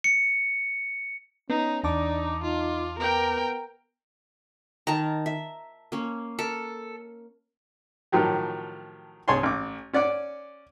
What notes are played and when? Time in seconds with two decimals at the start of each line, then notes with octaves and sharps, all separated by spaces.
0.04 C#7
1.50 B3 C#4 D#4
1.84 E2 D4 D#4 A5 D6
2.43 D#4 F4
2.99 B3 A#4 G5
4.87 D#3 D#4 A#4 A5 A#5
5.26 E5
5.92 A#3 C#4
6.39 A4 A#4
8.12 A2 D#3 F3 F#3 G4
9.28 C2 G#4 C#5 G#5 A5 C6
9.43 A1 D6
9.93 C#4 D5 F#5 D6